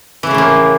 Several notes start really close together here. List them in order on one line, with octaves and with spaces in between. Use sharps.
E3 C#3 A3 A2 A#3